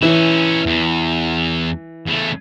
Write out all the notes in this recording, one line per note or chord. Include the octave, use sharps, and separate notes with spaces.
E3 C#4 E4
E2
E2 A3